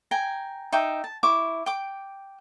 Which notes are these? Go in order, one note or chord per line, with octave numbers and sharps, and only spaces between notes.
G5 G#5 A#5
D#4 E5 G5 D6
A5
E4 C#6 D6
G5 D6